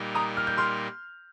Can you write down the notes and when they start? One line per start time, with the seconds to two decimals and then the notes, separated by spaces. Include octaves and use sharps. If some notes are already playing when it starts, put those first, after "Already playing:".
Already playing: A#2 G3 D#4 A#4
0.15 A#5 D#6
0.37 F6
0.47 G6
0.58 C6 F6